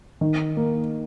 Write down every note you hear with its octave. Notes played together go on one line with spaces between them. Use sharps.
D#3
A#3